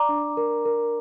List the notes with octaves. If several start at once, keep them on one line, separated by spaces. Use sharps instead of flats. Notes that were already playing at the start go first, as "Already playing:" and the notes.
Already playing: D5 A#5 D6
D4
A#4
A#4